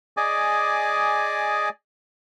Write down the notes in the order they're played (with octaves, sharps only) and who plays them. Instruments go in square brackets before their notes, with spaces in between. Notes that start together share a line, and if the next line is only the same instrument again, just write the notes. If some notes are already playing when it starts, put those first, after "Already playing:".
[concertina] G#4 D5 D#5 G#5 D6